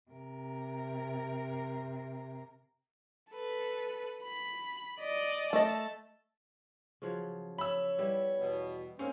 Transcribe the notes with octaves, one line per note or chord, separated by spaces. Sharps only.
C3 A#4
A4 B4
B5
D5 D#5
A3 D#5 A5
C#3 F3 F#3
C#5 B5 E6
G3 B3 E4
E2 B2
G#2 A#3 C4 C#4